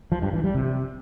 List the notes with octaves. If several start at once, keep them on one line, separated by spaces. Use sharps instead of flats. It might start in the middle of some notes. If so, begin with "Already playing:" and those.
F3
G2
E3
G3
C3